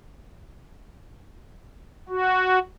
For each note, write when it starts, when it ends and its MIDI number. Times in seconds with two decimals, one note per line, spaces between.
2.09 2.59 66